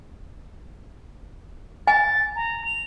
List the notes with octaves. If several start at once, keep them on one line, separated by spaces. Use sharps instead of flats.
G#5 A6
A#5
F7